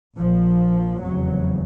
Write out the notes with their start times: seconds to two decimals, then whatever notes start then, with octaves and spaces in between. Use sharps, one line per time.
0.17 A#1 A#2 F3
1.02 F1 E2 C#3 F#3